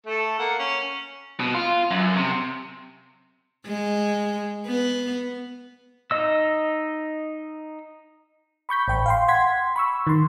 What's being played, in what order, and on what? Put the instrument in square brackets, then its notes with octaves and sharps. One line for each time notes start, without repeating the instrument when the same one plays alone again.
[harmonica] A3 A4
A#3 F#5
C#4
[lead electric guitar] B2
F4
F#2
C3
[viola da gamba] G#3
B3
[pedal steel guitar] D#4 D#5 E6
[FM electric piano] B5 C#6 G6 B6
A1 G5 B5
F5 G5 C6
F#5 C6 G#6 B6
B5 C#6 E6
D#3 C6